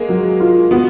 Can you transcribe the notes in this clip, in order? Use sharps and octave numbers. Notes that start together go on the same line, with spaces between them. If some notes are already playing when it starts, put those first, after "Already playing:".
Already playing: G#3 A#3
F#3
F4
B3 F#4